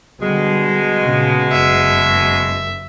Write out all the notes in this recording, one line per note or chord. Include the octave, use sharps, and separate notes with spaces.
B2 D3 G3 G#3
A#2 C#3
F#1 E5